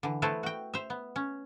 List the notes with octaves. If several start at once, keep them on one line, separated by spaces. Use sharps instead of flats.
D3 E3
A3 B3 E4 A4 B4 C5
F#4 G5
C5 E5
B3
C#4